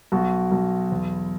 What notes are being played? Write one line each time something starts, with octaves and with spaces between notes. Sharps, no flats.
B1 F#4
B1
E2